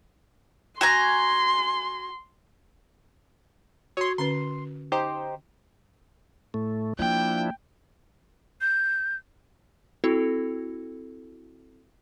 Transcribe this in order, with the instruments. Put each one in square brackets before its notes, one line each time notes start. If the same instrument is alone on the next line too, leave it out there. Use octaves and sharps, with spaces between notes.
[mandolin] F#4 G#5 A#5 [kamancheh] C6
[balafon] F#4 [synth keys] C#5 C6
[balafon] D3 C#4 B4 [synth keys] C6
[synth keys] D#4 G4 C5
[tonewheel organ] A2 A3
[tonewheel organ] F3 D4 E4 [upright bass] A#3 [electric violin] G5
[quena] G6
[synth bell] C4 E4 F#4 A4